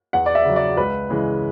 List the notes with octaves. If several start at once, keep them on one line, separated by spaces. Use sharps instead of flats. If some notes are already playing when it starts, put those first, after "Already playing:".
E2 F#5
D5
E5
C#3 F#3
D5
C#2 B4
C#3 E3 G#3